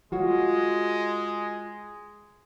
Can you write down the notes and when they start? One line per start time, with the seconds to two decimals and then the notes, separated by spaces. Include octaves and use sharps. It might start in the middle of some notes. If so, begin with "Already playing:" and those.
0.12 G#3 F4 F#4 C#5